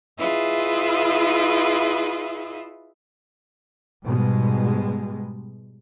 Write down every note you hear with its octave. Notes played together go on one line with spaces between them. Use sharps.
E4 F4 G#4 B4 D#5 E5
G#2 B2 G3 G#3